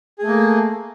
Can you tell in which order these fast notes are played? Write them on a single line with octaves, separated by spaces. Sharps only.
G#4 A3 A#3